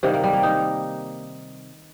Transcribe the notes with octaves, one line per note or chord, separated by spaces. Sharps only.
C3 D#3 G3 A#3
A#3
G3
A#3
D#4